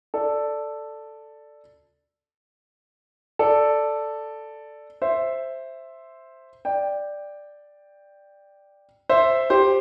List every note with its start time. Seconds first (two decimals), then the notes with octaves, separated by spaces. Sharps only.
0.14 A4 D5
3.39 A4 D5
5.02 C5 E5
6.65 D5 G5
9.09 C5 E5
9.50 G4 C5